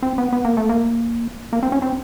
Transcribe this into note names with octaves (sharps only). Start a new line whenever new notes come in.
C4
B3
B3
A#3
A3
A#3
A#3
C4
C#4
C4